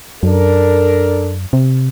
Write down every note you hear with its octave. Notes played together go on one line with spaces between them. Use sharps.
F#2 D4 A4 A#4
C3